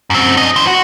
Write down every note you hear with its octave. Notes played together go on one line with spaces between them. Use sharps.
F#2 C4
D4 D#5
E3 C5
F#4